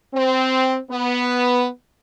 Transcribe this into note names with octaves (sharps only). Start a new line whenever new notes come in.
C4
B3